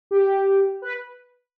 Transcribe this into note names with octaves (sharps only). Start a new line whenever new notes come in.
G4
B4